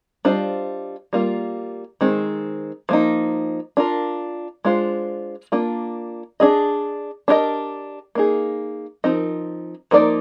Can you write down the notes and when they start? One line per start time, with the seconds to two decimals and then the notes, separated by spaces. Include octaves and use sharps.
0.25 G3 D4 F4 C5 D#5
1.13 G3 A#3 F4
2.01 D#3 G#3 C4
2.89 F3 A#3 D#4
3.77 D4 F4 A#4
4.65 G#3 D4 F4 C5
5.52 A#3 D4 F4
6.40 D4 G#4 D#5
7.28 D4 G4 A#4 D#5
8.15 A#3 D#4 G#4
9.04 F3 C4 D#4 A#4 D#5
9.91 F3 A#3 D#4 A#4 D5